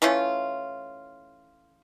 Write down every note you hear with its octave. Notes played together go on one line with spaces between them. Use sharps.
E3 A3 C#4 F4